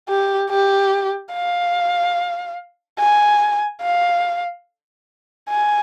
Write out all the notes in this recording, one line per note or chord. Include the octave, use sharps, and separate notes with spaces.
G4
G4
F5
G#5
F5
G#5